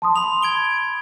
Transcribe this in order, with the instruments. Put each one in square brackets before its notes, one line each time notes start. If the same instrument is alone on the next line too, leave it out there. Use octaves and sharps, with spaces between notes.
[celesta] A5 C6 D#6
[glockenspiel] B5 F7
G#6 D7 G7